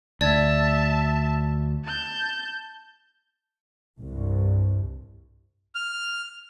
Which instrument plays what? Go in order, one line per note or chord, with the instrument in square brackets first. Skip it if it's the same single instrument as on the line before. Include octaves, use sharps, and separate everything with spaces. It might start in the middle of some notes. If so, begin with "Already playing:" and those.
[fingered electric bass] D2 [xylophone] D5 G#6 [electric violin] E5 A5
[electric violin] A5 G6
[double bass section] C2 G2
[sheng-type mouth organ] F6